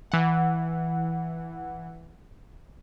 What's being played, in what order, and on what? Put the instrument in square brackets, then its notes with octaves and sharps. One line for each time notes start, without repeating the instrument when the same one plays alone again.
[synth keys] E3 F#5